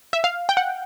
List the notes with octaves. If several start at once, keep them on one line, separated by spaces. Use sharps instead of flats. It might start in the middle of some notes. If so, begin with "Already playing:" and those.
E5
F5
G5
F#5